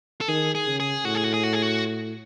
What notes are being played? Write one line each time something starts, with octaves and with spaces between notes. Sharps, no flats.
A4
D#3 G#4
G#4
C#3
G#4
A2 F#4
G#4
F#4
G#4
F#4
G#4
F#4